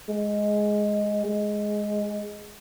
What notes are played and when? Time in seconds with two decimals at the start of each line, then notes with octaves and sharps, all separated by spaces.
0.09 G#3
1.25 G#3